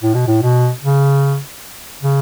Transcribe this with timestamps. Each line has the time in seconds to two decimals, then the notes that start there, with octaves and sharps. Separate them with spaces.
0.03 A2
0.15 B2
0.27 A2
0.42 B2
0.83 C#3
2.03 C#3